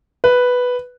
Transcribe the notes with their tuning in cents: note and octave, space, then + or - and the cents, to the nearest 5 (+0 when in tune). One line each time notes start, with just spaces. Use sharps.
B4 +0